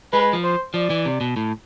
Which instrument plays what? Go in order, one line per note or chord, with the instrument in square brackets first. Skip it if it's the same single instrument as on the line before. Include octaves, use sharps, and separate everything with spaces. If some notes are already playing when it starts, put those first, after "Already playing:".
[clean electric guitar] G#3 [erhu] B4
[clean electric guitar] F3
[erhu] C5
[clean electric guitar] F3 [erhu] D5
[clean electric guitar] E3
C3
B2
A2